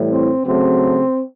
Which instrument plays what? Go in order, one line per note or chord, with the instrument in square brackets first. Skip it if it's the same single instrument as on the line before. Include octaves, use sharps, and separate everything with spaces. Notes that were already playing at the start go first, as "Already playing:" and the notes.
Already playing: [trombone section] A2 E3 G3
C4
C#3 F#3 A3 C4